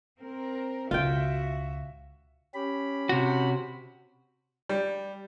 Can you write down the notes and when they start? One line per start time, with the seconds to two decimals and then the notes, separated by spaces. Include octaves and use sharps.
0.20 C4 A#4
0.91 C#2 B2 F4 F#4 E5 G5
2.54 C#4 G4 B5
3.09 C3 F#4
4.69 G3